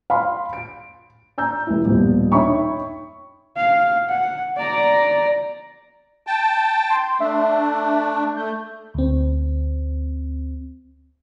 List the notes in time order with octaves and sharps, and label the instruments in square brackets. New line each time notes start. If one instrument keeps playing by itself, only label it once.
[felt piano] F5 B5 C6
D7
A#5 E6 G6
F1 E4
D#1 B2 F3 G3
D#4 C#5 E5 G5 B5 C#6
[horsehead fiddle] F5
F#5
D5 A#5
[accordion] G5 A5
[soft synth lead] C6
[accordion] A3 D4 [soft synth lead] E5
[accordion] A3 [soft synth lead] G6
[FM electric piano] D2 C4